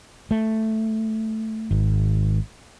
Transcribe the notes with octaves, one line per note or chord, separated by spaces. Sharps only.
A3
G#1